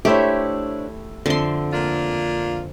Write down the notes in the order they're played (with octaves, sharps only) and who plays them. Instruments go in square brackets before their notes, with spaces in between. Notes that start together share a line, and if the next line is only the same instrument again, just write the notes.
[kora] A3 E4 [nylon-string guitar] D4 C5 C#5 [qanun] G4
[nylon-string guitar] F2 C4 E5 [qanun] D3 C6
[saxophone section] A#3 D4 F4